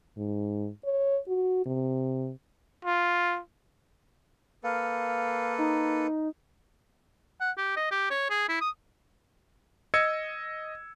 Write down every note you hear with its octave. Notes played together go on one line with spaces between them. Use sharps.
G#2
C#5
F#4
C3
F4
A#3 A4 B4 F5
D#4
F#5
G4
D#5
G4
C#5
G#4
E4
D#6
D#5 E6 G#6 C#7